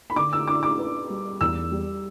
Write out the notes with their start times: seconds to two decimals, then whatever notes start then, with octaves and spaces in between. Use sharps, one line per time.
0.10 B5
0.16 D3 D6
0.33 E6
0.47 D4 D6
0.63 D6
0.79 B4
1.10 G3
1.41 E2 E6
1.72 G3